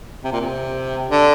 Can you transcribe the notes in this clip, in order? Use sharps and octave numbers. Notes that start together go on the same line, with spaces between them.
C3
A#2
C3
D3